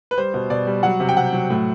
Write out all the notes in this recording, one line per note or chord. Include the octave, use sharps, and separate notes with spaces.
B4
G3 C5
B2
B2 D5
G3
F#3 F#5
C3
G5
C3 F#5
F#3
A2